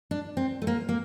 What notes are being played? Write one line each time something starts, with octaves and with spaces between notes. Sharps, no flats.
D4
C4
A3
A#3
A#3